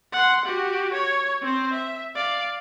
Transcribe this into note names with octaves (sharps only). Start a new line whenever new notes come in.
F#5 C6
F#4 G4
C#5
C4 C5
E5
D5 F5